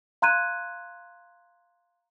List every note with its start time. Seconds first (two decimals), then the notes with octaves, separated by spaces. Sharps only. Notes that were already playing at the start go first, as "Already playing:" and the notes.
0.22 F5 A#5 C6 F#6 G#6 D#7